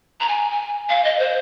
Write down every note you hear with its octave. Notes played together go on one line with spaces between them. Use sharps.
A#5
G#5
G#5
F5
D#5
C5